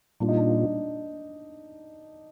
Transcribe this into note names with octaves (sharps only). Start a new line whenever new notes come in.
A#2 G3 A#3 D4 F4
D#4
D4